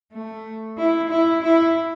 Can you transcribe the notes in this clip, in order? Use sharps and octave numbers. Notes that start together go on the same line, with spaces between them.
A3
E4
E4
E4